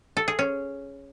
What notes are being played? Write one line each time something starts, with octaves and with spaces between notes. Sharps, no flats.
A4
G#4
C#4